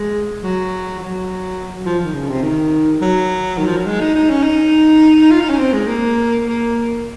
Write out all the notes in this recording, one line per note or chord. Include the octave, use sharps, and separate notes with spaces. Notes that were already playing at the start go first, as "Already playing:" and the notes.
Already playing: G#3
F#3
F#3
F3
D#3
C#3
C3
D#3
F#3
D#3
F3
F#3
G#3
D#4
D#4
C#4
D#4
F4
D#4
C#4
C4
G#3
A#3
A#3